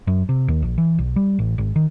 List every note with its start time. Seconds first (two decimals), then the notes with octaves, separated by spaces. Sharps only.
0.07 F#2
0.29 C3
0.48 D#2
0.62 A#1
0.78 E3
0.98 B1
1.16 G3
1.39 A1
1.58 G#1
1.76 D#3